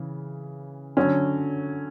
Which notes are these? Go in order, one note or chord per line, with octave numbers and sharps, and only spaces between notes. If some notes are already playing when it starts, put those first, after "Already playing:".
Already playing: C#3 E3
D3 F#3 C#4